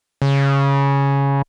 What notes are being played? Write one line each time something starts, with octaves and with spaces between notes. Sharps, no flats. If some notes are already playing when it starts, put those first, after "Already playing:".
C#3